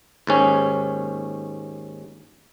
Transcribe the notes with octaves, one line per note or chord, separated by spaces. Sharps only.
D#2 G#2 C#4